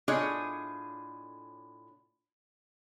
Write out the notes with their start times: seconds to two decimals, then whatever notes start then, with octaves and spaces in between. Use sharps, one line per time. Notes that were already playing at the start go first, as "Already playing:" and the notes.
0.08 A2 D4 F4 G#4 C#5 D#5